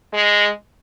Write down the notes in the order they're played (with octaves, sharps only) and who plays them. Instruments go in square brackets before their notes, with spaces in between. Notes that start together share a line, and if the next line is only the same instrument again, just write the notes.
[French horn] G#3